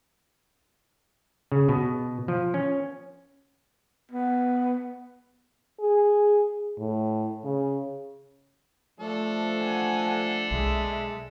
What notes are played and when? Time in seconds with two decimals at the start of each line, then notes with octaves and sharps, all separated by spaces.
1.52 C#3
1.69 B2
2.28 F3
2.54 C#4
4.11 B3
5.80 G#4
6.78 A2
7.44 C#3
9.00 F3 A3 D4 A4
9.61 F#5 G#5
10.50 B1 G#3 E5